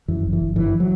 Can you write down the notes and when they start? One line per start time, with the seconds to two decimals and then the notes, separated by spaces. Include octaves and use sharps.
0.08 F#2 E3
0.25 G1
0.33 E3
0.40 G1
0.56 F#2 E3
0.80 F#3